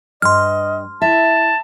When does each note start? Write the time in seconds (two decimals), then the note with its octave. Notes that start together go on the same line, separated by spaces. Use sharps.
0.22 G2 D#5 C6 F6
1.02 E4 E5 A5